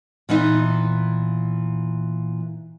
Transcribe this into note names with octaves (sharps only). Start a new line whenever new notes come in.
A#2 E3 B3 D#4